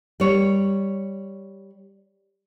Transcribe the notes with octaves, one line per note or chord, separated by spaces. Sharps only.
G3 C#5